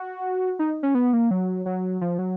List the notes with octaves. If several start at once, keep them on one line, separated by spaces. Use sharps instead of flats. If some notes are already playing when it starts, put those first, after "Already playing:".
Already playing: F#4
D#4
C#4
B3
A#3
F#3
F#3
F3
F#3